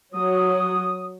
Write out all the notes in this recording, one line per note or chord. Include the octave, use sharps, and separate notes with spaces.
F#3 D#6